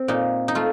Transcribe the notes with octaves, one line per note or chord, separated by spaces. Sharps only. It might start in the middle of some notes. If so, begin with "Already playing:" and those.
Already playing: C4
A#2 D#4
D#4
A3 F4